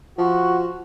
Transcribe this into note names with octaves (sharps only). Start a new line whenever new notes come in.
F3 F#4